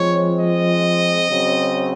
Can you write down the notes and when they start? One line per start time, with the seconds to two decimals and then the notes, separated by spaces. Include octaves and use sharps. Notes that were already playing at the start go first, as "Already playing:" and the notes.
Already playing: F3 G#3 C4 C#5
0.37 D#5
1.29 C#3 F#3 C4